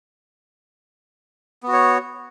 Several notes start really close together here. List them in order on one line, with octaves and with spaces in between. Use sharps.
B3 F#4 C#5